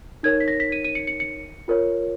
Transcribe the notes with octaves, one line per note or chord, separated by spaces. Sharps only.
D#4 A#4 C#5 G#6
B6
A#6
B6
D#7
D#7
C#7
C#7
C#7
F4 A#4 C#5